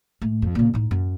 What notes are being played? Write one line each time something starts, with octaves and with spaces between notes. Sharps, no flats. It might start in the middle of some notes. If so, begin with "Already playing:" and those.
A2
F2
A#2 C#3
A2 D#4
F#2